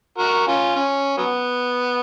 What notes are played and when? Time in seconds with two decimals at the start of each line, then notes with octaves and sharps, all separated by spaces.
0.18 F#4 A#4
0.47 C#4 F4
0.75 C#4
1.17 F#3 B3